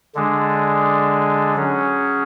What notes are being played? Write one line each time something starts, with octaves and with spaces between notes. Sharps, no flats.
D3 G#3 D4 G#4
F#3 C#4 G#4